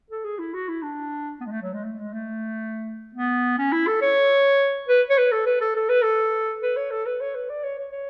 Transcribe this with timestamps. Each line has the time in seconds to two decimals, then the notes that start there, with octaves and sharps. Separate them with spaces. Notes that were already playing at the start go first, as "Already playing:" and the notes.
0.11 A4
0.25 G#4
0.39 E4
0.54 F#4
0.69 E4
0.83 D4
1.41 B3
1.46 G#3
1.52 A3
1.62 F#3
1.73 G#3
1.84 A3
1.99 G#3
2.13 A3
3.15 B3
3.58 C#4
3.72 E4
3.87 A4
4.02 C#5
4.89 B4
5.10 C#5
5.18 B4
5.32 A4
5.46 B4
5.61 A4
5.76 A4
5.89 B4
6.02 A4
6.62 B4
6.77 C#5
6.91 A4
7.06 B4
7.21 C#5
7.35 B4
7.49 D5
7.64 C#5
7.78 C#5
7.92 C#5